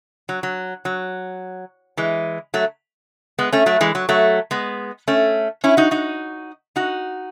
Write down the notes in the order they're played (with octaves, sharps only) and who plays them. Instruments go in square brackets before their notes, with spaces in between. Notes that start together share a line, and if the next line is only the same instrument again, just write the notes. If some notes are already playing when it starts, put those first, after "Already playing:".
[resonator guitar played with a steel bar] F#3
F#3
F#3
E3 G#3
F#3 A3
G#3 B3
A3 C#4
F#3 A3
E3 G#3
F#3
F#3 A3
G#3 B3
A3 C#4
C#4 E4
D#4 F#4
D#4 F#4
D#4 F#4